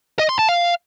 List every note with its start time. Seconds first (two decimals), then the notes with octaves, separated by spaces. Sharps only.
0.19 D#5
0.29 C6
0.39 A5
0.49 F5